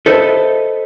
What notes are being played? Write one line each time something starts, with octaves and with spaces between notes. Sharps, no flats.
A4 B4 C5 D#5 E5